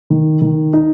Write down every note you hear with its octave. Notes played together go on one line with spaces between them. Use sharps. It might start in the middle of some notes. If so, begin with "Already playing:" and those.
D#3
D#3
D#4